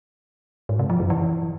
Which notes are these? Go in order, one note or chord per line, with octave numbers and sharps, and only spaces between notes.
G#2
C3
F3
F#2
E3